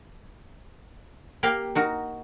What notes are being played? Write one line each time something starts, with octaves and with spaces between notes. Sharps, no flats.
A#3 G4 A#4 F5 G5
D#4 F#4 A#4